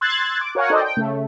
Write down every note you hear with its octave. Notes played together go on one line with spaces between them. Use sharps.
C6 E6 F#6 G#6 A6
D6
F#4 A#4 C#5 F5 F#5 G#5
D#4 A4 C5 D5 D#5
G5
C#3 A3